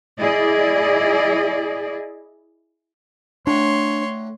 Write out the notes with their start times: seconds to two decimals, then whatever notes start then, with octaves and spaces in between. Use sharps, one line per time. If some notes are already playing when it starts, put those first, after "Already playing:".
0.18 E4 G#4 D5 D#5
3.47 A2 D3 D4 C#5 C6